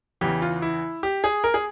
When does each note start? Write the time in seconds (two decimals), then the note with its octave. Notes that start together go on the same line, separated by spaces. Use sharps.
0.21 E2 C#3 E3 G4
0.42 F4
0.62 E4
1.03 G4
1.24 G#4
1.44 A#4
1.54 G#4